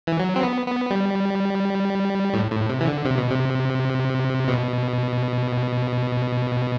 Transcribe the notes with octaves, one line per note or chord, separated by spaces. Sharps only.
E3
F#3
C4
B3
B3
G3
A2
A2
C3
E3
D3
C3
B2
C3
B2